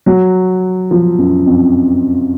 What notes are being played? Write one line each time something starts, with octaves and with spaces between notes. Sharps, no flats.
F#3
F3
F#2
F2